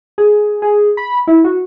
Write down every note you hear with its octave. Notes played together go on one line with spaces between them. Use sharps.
G#4
G#4
B5
E4
F#4